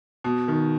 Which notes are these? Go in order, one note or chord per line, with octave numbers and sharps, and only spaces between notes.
B2
D#3